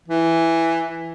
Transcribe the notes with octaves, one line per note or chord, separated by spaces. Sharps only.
E3